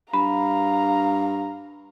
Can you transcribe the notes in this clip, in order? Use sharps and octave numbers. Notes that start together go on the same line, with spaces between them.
G2 F5 A#5 B5